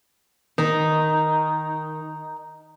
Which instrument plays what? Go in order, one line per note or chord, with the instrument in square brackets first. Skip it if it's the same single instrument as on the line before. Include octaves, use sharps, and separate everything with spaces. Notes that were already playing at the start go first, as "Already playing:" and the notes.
[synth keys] D#3 [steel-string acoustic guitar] D#4